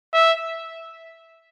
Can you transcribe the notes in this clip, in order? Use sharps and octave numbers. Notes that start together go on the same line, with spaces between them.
E5